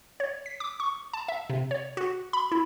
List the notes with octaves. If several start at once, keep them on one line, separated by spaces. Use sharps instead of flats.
C#5
B6
D6
C#6
A5
E5
C3
C#5
F#4
B5
E4